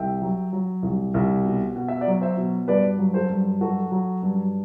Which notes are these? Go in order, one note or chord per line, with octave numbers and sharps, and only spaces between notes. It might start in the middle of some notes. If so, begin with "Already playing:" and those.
Already playing: C2 E5 G5
F#3
F#3
C2
C2
B2
B2 F#5
E5
D5 F#5
F#3
C5 E5
B2
G2 B4 D5
F#3
A4 C5
G2
F#3 F#4 A4
F#3
G2